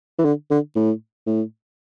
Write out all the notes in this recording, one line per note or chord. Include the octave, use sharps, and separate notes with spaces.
E3
D3
D3
A2
A2